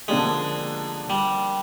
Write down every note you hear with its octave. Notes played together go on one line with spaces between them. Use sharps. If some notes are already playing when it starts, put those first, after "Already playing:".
D3 F3 G#3 A#3 D4 G4
G3